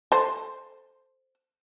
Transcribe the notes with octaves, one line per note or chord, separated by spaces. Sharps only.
A4 C5